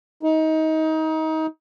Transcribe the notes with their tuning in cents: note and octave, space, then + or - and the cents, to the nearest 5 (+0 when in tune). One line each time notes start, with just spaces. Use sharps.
D#4 +25